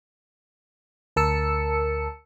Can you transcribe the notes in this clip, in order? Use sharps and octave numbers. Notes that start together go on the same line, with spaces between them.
D2 A#4 A5 E6 C#7